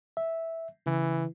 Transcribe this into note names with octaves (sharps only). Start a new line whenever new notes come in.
E5
C#3 E3